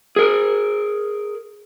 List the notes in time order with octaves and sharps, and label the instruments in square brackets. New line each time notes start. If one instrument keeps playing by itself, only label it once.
[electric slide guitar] G#4 A#4